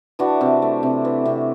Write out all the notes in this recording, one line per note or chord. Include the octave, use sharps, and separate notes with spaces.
E3 D4 F#4
C3
A3
C3
E3
C3